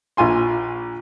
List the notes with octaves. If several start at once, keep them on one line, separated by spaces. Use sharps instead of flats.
A#1 F4 G#5 C6